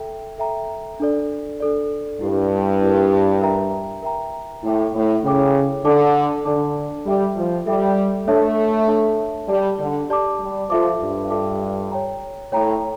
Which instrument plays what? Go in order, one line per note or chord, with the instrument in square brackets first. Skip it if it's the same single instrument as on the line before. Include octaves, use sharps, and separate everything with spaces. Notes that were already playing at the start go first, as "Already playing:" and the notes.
Already playing: [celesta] A4 E5 G5 A#5
A4 E5 G5 A#5
D4 A4 D5
D4 A4 D5
[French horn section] G2 [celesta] E4 G4 A#4
[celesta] E4 G4 A#4
A#4 E5 G5 A#5
A#4 E5 G5 A#5
[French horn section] A2 [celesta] E4 A4 C#5 G5 D6
[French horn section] A2
[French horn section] C#3 [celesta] E4 A4 C#5 G5 D6
[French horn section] D3 [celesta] D4 A4 D5 A5 D6
[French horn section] D3 [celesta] D4 A4 D5 A5 D6
[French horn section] G3 [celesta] A4 E5 G5 D6
[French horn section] F3
[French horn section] G3 [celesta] A4 E5 G5 D6
[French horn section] A3 [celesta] D4 A4 C#5 E5 A5
[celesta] D4 A4 C#5 E5 A5
[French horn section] G3 [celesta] G4 D5 A5 D6
[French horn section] D3
[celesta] G4 D5 A5 D6
[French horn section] G3
[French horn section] F3 [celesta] F4 A4 E5 A5 D6
[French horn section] G2
[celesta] F4 A4 E5 A5 D6
C#5 G5 A#5
[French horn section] A2 [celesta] C#5 G5 A#5